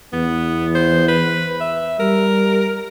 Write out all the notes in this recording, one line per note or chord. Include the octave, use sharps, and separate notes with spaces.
E2 B3
C5
B4
E5
G3 A#4